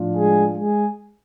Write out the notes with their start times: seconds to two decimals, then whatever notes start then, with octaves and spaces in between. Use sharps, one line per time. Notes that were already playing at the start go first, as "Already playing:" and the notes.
Already playing: A2 F3 D4 F4
0.16 G#3 G#4
0.58 G#3 G#4